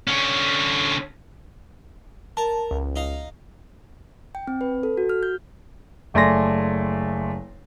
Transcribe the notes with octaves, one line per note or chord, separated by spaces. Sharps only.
D3 C#4
A#4 A5
C#2
D#4 D#5 F5
G5
C4
B4
A4
F#4
F6
G6
F#1 A3 D5 G#5 C6 A#6